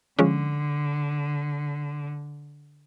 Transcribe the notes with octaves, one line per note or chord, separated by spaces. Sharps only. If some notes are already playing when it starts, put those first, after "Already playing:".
D3 F3 G#3 C#4